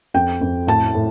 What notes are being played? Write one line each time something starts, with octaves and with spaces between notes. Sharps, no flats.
F2 G5
F2
A2 A5
A2